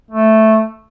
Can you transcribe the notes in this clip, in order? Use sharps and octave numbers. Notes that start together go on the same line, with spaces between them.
A3